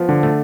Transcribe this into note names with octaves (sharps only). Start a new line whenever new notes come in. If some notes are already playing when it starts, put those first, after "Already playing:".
Already playing: F3 B3
D3
A3